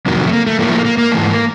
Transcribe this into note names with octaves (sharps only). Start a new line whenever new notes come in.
F2 C3 D#3 F#3 A#3
A3
A#3
A3
A2 F3 A3 A#3
A#3
A#3
A#3
G#2 E3 A3